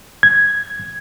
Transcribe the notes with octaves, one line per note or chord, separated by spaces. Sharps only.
G#6